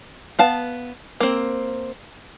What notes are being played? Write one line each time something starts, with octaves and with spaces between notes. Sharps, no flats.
B3 F5 A5
A#3 C4